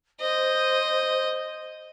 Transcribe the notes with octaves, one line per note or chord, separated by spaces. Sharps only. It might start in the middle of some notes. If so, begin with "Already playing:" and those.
C5 D#5